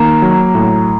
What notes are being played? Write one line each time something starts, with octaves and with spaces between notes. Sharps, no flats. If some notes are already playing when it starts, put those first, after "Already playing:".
Already playing: D#3 A#3 A#5
F#3
A2